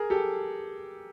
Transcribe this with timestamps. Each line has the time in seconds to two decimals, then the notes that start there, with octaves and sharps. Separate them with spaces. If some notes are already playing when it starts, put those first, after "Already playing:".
Already playing: G#4 A#4
0.10 G4 A4